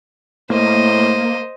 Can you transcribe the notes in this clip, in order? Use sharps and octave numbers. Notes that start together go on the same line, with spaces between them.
A2 A#3 C5 D#5